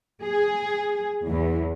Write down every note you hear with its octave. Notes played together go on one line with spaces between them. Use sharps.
G#4
E2